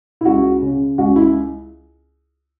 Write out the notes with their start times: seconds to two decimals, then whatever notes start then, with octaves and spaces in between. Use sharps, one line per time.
0.21 E4
0.25 C#2 F#4
0.62 C#3
0.98 C#2 F#4
1.16 E4